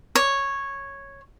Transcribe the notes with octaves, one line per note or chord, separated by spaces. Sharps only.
C#5